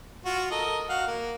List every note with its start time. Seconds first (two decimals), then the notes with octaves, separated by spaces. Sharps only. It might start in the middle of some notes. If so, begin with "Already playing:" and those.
0.25 F4 F#4
0.51 A4 A#4 D#5
0.89 F#4 F5 F#5
1.07 A#3